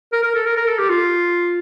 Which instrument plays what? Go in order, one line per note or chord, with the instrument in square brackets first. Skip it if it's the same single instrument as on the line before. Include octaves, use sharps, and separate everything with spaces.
[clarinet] A#4
A#4
A4
A#4
A#4
A4
G4
F4